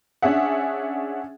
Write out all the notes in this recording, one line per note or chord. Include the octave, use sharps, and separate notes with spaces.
C#4 D4 G#4 E5 F#5